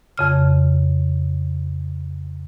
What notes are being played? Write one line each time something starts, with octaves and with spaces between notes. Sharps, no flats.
F2 C#3 F6